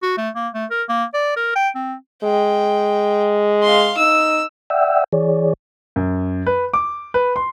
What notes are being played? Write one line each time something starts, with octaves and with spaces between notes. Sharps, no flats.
F#4
A3
A#3
A3
A#4
A#3
D5
A#4
G5
C4
G#3 G5
F5 C6
D#4 E6
D5 E5 F#5 G5 E6
E3 G#4 C#5 D5
F#2
B4
D6
B4
C6